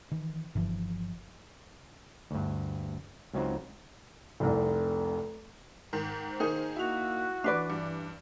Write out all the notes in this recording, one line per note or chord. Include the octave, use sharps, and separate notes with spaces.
D#3 E3
G1 G2 E3 F3
D2 G2
C#2 F#3 C4 D#4 F4 C5
F1 C2
G#2 D#3
C5
D#3 A#3 D#4 G#4
A#3 E4 F#4 F7
E3 D4 B4 D5
G2